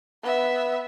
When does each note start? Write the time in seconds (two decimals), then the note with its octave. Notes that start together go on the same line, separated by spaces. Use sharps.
0.23 B3 E5